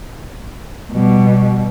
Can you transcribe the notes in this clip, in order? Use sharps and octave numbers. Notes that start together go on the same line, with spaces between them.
B2 G3